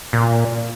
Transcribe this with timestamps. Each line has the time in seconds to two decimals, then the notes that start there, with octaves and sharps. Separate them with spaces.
0.13 A#2